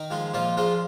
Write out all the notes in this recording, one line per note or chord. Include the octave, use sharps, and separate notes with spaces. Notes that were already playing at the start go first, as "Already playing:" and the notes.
Already playing: D#3 D#4
F3 G#3
A#2 F3 F4
F3 G#3 F4